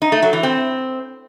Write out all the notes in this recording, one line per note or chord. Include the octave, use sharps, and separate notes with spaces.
D#4
A3
F#3
E3
C4